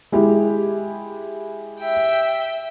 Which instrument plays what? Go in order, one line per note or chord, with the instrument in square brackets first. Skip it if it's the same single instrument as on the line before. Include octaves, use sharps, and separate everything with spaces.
[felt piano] G#3 E4 G4
[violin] E5 G5